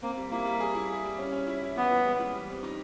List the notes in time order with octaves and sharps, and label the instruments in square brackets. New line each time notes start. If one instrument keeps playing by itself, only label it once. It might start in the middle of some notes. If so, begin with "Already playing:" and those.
[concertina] A#3 [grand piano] C4
[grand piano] G3
[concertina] A#3 [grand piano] E4
[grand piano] G3
G#4
E4
G#4
G3
C#4
C#4
E4
E4
[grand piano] E3 [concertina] B3
[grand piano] E3
G#3
E3
G3
C4
D#4